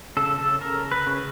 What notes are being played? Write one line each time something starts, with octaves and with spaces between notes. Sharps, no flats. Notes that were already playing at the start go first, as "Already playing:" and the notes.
C#3 A4
A4
C#3 A#4
B4
C#3